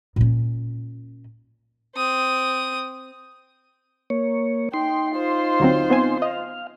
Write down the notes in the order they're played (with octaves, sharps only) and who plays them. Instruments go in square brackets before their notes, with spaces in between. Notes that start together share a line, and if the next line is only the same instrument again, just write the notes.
[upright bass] A#2 C#4
[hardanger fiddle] C4 D#6
[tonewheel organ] A#3 C#5
[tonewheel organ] D#4 C6 [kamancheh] G5
[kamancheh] F4 C5
[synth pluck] D2 F#3 C4
B3 C4 G#5
[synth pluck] D#5 [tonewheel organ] F5